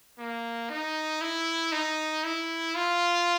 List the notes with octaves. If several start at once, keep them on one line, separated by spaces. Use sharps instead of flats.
A#3
D#4
E4
D#4
E4
F4